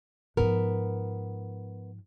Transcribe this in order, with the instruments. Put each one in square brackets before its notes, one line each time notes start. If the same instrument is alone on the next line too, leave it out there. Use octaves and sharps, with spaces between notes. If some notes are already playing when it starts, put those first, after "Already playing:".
[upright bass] G#2 F3 [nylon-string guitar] B3 A#4